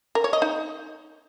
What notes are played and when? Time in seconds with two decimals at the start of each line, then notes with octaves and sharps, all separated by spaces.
0.15 A#4
0.24 C#5
0.33 D#5
0.42 D#4